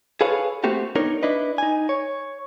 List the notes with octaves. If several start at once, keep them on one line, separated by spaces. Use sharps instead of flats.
G#4 A4 B4 C#5 F5
A3 A#3 C4 F#4 G4 A4
B3 D4 D#4 A#4 C#5
D4 E4 B4 D#5
D#4 G#5
C#5